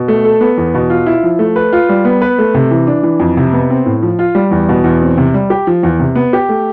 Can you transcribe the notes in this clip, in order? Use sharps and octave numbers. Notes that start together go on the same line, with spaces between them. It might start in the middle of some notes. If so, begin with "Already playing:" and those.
Already playing: B2
A3
A4
B3
E2
B2
F4
E4
F3
A3
B4
F4
G3
B3
B4
A3
C3
E3
D4
E3
F2
C3
B3
C4
A2
F3
F4
G3
E2
B2
E2
C4
C3
G3
G4
F3
E2
C3
B3
G4
A3